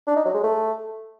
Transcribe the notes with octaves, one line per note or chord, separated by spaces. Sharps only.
D4
D#4
F#3
G#3
A3